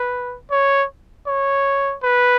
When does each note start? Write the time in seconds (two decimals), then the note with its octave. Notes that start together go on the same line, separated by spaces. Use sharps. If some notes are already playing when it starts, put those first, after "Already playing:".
Already playing: B4
0.51 C#5
1.27 C#5
2.03 B4